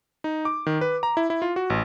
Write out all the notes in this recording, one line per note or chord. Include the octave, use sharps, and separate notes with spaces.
D#4
D6
D#3
B4
A#5
E4
E4
F4
F#4
A1